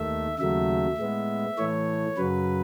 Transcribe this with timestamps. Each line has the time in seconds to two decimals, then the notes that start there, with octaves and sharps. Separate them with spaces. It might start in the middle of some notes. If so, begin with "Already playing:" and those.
Already playing: D#2 D#3 A3 E5
0.39 D#2 C#3 F#3 A3 E5
0.98 A2 G#3 B3
1.58 A2 E3 A3 C#5
2.17 F#2 C#3 F#3 B4